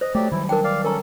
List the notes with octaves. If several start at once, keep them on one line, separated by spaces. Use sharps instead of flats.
C5 D#5
F#3 A3 G4 D5
D#3 F#3 G3 E4
D4 A#4 G5
D5 F5
C#4 A4 A#4 A#5